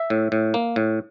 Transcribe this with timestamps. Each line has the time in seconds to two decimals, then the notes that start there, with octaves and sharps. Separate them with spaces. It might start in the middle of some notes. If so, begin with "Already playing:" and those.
Already playing: E5
0.10 A2
0.32 A2
0.54 A#3
0.76 A2